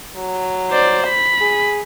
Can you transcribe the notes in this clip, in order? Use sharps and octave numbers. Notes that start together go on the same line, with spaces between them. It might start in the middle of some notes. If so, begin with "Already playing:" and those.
F#3
C5 D5
B5
G#4